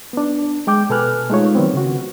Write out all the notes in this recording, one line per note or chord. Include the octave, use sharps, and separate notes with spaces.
B3 D4
G#3 G5 D6 G6
B2 A4 B4 G#5 F6 F#6
G#3 A3 D#4 F4 C#5
D#3 F#3 B3 C4
C#3 F#4